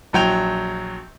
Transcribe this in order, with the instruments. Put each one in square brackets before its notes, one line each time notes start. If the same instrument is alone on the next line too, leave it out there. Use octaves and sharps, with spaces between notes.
[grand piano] A#1 F#3 G5 F7